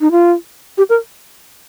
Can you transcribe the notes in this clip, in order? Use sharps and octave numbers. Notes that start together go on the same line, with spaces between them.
D#4
F4
G4
A#4